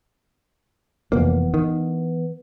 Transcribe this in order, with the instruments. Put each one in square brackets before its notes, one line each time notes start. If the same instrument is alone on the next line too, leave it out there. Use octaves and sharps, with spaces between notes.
[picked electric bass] F1 A#3 [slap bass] E3 B3
[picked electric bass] D#3